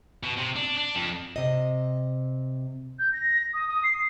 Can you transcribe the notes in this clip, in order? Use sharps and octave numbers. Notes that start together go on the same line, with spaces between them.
B2
C3
D4
D4
F2
C3 D#5
G6
A#6
D#6
D#6
C7